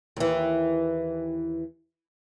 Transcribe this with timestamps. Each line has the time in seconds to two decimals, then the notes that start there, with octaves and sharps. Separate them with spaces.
0.17 D#2 E3